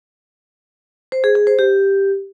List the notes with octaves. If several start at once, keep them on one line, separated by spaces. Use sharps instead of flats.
C5
G#4
G#4
C5
G4